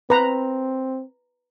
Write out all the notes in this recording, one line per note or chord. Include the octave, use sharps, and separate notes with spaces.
C4 B4 A#5